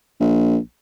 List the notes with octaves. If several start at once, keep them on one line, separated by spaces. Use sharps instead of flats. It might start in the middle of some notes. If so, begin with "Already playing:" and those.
A#1